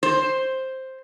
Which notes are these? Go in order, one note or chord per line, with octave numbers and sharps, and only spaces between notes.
C5